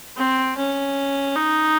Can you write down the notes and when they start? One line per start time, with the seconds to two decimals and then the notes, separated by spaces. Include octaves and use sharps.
0.17 C4
0.57 C#4
1.37 D#4